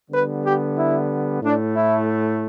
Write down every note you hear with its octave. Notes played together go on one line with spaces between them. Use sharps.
D3 G3 B3 B4
G4
E4
A2 A3 D4
E4